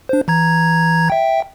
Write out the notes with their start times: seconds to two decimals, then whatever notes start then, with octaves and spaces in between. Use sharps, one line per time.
0.09 D4 C5
0.28 E3 A#5 G#6
1.10 E5 G5